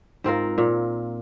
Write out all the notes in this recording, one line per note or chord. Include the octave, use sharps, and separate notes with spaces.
G#2 C4 F4 A#4
A#2